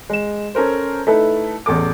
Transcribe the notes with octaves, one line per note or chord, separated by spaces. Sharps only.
G#3 E7
C#4 A4 A#4 C5
A3 D#4 E4 A4 B4
A1 E2 A4 D6